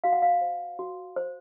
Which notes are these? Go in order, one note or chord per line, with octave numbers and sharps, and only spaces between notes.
F#4 F5
F#5
F5
C5
F#4
C5